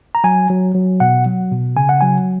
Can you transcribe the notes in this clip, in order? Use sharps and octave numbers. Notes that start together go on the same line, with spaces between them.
A#5
F#3 G#5
F#3
F#3
B2 F#5
F#3
B2
C#3 G#5
F#5
F#3 G#5